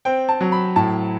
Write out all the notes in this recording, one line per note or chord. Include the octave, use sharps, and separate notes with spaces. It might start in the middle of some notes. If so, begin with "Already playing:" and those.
C4 G5
A5
F#3
B5
A2 A5